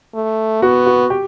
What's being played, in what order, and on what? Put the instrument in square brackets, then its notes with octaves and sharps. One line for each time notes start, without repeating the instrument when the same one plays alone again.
[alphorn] A3
[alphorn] B3 [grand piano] F#4
[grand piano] F#4
G4